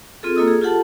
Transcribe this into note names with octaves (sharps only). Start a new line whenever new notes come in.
C4 F4 G#4 A4
A#3 F4 A4 D#5 D#6 E6
G#4
F4 G4 A4 F#5 A5